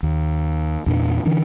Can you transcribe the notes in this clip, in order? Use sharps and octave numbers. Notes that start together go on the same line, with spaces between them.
D#2
E2 A#2 D4
D3 E3 D4